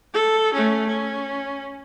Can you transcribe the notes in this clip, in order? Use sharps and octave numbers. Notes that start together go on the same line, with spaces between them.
A4
A3 C#4
C#4